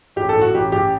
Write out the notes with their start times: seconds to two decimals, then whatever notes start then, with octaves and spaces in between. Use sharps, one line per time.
0.16 A1 G4
0.29 A4
0.35 A2
0.41 F#4
0.54 A1 G4
0.72 A1 G4